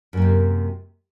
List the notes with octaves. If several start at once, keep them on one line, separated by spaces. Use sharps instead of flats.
F#2 C3 A#3